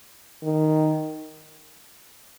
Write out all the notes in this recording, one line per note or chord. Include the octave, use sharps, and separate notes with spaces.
D#3